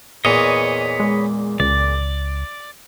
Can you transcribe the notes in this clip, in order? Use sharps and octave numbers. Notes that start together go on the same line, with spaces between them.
E2 A#2 B4 C#5 D#5
G#3
C#2 D5